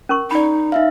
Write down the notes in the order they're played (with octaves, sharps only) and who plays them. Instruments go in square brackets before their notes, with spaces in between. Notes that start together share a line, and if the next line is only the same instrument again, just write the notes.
[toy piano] C#4 A#4 C#6
[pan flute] D#4 [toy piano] D5 B5
[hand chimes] D#4 E5 F5